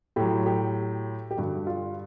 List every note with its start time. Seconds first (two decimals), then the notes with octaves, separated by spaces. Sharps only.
0.16 A2 F#3 G4
0.46 G4
1.31 G4
1.37 G2 D3 G3 F#4
1.67 F4